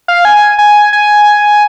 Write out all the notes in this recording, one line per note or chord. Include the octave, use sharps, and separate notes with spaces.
F5
G#5
G#5
G#5